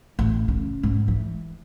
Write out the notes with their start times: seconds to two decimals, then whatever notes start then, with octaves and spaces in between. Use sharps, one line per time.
0.19 A1
0.48 C#3
0.83 G#2
1.08 E3